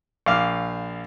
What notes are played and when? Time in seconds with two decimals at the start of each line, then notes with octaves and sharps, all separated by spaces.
0.26 A#1 F5 D6 F6